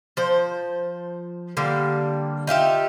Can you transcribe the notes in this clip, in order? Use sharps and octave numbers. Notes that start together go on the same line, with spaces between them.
F3 C5
D3 G3 A#3
D#4 F4 G4 E5